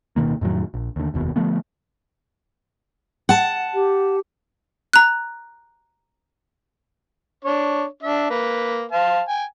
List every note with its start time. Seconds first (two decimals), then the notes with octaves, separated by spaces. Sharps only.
0.16 D1 B2 D#3 A#3
0.41 F2 A2 D#3 F#3
0.74 A#1
0.96 D#2 D3
1.14 F1 D#2 B2
1.36 D3 F3 A3 B3
3.29 F#5 A5
3.74 G4
4.93 A#5 F#6
7.45 D4 C#5
8.03 D4 E5
8.30 A#3 B4
8.92 C5 F5 A5
9.28 G5 G#5